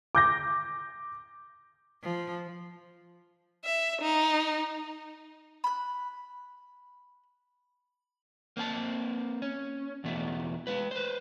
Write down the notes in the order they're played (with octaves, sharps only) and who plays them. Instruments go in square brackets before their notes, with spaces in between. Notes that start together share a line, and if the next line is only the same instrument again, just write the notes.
[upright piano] D6 G6 A#6
[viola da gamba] F3
[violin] E5
D#4
[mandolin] B5 F#6
[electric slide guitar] A#3 C4 G#5 A5
C#4
E2 B2 A3
G#3 B4
B4 C5